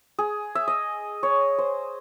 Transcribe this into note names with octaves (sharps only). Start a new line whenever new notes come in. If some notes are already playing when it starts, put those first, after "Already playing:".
G#4
E5
D#5
C#5
C5